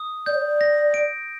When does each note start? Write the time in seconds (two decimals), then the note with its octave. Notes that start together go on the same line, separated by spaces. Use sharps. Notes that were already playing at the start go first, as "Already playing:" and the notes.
Already playing: D#6
0.26 D5 G6
0.34 C#5
0.41 D5
0.61 A#6
0.94 D7